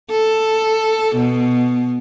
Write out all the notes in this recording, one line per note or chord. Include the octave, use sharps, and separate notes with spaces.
A4
B2